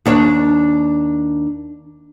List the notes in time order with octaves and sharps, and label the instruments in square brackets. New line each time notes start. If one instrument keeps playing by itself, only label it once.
[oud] D#2 D4 C#5